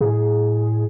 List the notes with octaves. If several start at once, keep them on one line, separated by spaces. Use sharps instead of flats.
A2 G#4